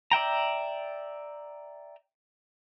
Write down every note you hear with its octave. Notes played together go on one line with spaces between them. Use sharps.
D5 E5 G5 A#5